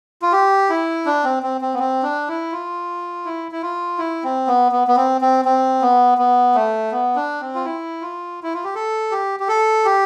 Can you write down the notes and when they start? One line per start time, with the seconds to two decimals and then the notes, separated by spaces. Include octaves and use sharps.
0.22 F4
0.32 G4
0.70 E4
1.06 D4
1.24 C4
1.43 C4
1.61 C4
1.74 B3
1.79 C4
2.03 D4
2.28 E4
2.52 F4
3.25 E4
3.52 E4
3.62 F4
3.98 E4
4.24 C4
4.47 B3
4.72 B3
4.88 B3
4.97 C4
5.21 C4
5.45 C4
5.82 B3
6.18 B3
6.55 A3
6.91 B3
7.16 D4
7.40 C4
7.55 F4
7.65 E4
8.02 F4
8.43 E4
8.54 F4
8.64 G4
8.75 A4
9.11 G4
9.40 G4
9.48 A4
9.85 G4